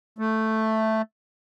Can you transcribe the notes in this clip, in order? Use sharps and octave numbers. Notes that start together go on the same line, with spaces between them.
A3